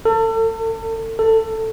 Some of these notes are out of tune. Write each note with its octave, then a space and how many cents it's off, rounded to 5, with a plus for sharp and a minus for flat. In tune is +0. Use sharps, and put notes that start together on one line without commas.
A4 +35
A4 +20